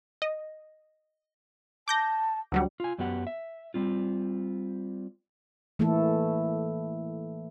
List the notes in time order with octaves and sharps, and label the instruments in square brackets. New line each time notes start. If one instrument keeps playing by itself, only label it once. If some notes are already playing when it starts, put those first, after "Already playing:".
[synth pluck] D#5
[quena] A5 [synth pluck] D6 G6 A#6
[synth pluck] D2 F#3 G3 [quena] F#5
[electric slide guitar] F4 G#5
F#2 F#3 B3 G4 F#5
E5
G3 C4 F4
[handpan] E3 A3 A#3 E4 A4